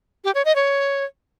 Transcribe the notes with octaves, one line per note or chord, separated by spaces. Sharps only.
G4
C#5
D#5
C#5